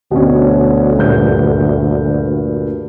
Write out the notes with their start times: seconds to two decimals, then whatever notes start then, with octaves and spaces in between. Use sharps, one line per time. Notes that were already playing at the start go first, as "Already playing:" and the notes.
0.11 D2 B2 C#4
0.99 G2 A#2 G6